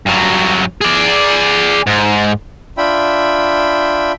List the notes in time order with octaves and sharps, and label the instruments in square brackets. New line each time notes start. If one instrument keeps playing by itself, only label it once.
[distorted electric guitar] G2 F#3
G#4 D5
G#2
[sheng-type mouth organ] D4 F4 E5 G5 B5